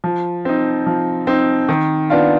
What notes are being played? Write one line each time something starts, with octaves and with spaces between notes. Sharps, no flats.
F3
C4 D#4
F3
C4 D#4
D#3
B3 D4 F4